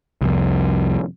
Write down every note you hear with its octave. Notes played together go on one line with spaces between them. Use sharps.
C2 F2